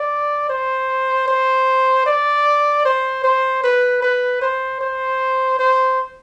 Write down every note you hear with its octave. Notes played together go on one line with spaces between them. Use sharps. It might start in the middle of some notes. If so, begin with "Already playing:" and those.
Already playing: D5
C5
C5
D5
C5
C5
B4
B4
C5
C5
C5